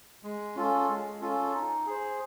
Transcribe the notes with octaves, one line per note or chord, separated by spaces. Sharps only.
G#3
C#4 F4 A4
G#3
C#4 F4 A4
D#4
G#4 C5